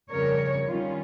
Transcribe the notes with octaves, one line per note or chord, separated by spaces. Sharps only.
F2 C#3 G3 A#4 C#5
D#3 G3 C#4 F4